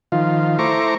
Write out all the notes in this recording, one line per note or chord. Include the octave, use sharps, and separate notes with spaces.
D#3 F3 F4
A3 E4 C5 A#5 C#6 D6